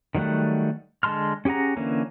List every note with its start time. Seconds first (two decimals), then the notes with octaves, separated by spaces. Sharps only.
0.15 D#3 F#3 G3 A3 F#5
1.03 D3 G#3 A5 C6 F6
1.45 C#4 G4 G#4 F#5 A#5
1.77 D3 E3 A#3 C#4